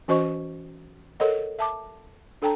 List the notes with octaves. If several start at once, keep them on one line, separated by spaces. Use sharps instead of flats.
E3 C#4 F#4 C5 D#5 C#6
A4 A#4 C#5 D#5 F#5
E5 A5 D6
D4 A4 C#5 G5 A5 A#5